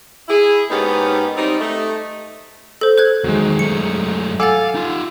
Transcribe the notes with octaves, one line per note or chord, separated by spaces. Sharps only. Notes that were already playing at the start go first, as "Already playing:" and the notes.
E4 G#4
G#2 A#3 B3 C#4 D#4 G4
G3 C4 D#4
A3 D#4
A4 C5
C5 F#6 G#6
E2 D#3 F#3 G#3
F#2 A3 C#7
A4 F5 F#5 G#5 D6 E6 A6
D#4 F4